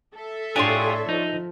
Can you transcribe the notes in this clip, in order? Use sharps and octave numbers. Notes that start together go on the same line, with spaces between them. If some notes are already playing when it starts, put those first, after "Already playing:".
A4 E5
A2 D4 F4 G4 G#4 C#5 C6
F3 D#4